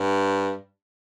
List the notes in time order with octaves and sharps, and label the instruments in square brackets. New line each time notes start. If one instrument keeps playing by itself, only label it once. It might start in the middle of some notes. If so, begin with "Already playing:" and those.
Already playing: [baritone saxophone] G2